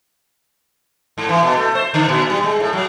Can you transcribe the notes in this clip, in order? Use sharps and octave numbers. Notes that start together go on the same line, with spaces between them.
G#2
E3
B2
A3
C5
D3
A#2
G3
G#3
A2
F#3